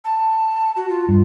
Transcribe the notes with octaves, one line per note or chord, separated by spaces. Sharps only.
A5
F#4
F4
G2